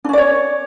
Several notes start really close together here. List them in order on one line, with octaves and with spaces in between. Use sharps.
D4 C#4 D5 C#5